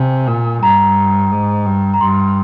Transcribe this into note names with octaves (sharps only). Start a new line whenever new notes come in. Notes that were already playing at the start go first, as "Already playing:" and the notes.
Already playing: C3 G#5
A#2
G2 A#5
G#2
G2
A#5
G2 C6